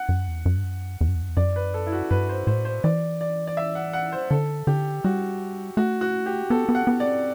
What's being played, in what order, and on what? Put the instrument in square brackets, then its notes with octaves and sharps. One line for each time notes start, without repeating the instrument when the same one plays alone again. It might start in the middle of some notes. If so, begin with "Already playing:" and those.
Already playing: [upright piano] F#5
[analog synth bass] F#2
E2
F#2
G2
F#2
E2
F#2
E2
F#2
E2
[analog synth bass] F#2 [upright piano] D5
[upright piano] B4
A4
E4
F#4
[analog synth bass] G2 [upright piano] B4
[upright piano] C5
[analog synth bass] A2 [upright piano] C5
[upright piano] C5
[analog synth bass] E3 [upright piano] D5
[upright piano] D5
D5
E5
F#5
F#5
C5
[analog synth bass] D3 [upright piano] A4
[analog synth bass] D3 [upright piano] G4
[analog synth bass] G3 [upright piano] F#4
[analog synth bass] A3 [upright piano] F#4
[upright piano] F#4
G4
[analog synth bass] B3 [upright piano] A4
[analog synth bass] B3
[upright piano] F#5
[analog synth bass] B3
[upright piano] D5
[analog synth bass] C4